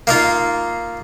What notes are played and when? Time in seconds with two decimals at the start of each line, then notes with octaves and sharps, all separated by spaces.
0.07 A#3 D#4 F4